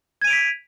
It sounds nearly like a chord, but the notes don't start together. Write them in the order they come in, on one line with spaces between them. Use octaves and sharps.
G#6 D#7 F7 D7 B6